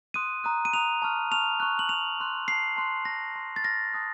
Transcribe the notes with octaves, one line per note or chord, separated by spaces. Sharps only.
C6 D#6 F#6 D#7
A#5 D#6 F#6
D#7
A#5 D#6 F#6 F7
A5 C#6 F6
A5 C#6 F6 F7
A#5 C#6 F#6
F#7
A#5 C#6 F#6 F7
A5 C6 F#6
A5 C6 F#6 C7
A5 C6 F#6
A5 C6 F#6 A#6
A5 C6 F6
A6
A5 C6 F6 A#6
A5 D#6 F#6